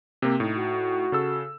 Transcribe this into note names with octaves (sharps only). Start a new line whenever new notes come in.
C3 A#3 C4
A2 D#4
F#4
C#3 A4 E6